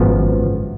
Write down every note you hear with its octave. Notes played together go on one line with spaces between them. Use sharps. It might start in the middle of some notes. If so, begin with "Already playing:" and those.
Already playing: G#1 F#2 F3 B3